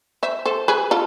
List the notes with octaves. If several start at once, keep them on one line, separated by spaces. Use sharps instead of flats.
C5 E5
A4 C5
G#4 B4
F4 A4